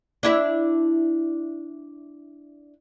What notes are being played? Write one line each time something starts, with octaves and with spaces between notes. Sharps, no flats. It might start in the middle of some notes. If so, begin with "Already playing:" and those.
D4 E4 E5